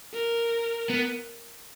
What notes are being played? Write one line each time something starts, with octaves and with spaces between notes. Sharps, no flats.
A#4
B3